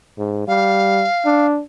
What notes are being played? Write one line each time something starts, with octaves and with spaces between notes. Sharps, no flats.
G#2
G3 F5
D4